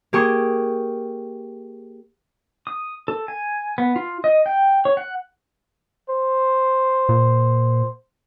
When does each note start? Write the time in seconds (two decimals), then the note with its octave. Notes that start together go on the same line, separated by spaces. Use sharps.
0.13 A#3 G4 G#4 C#6
2.67 D#6
3.08 A4
3.28 G#5
3.78 B3
3.96 F4
4.24 D#5
4.46 G5
4.85 C#5
4.97 F#5
6.10 C5
7.09 A#2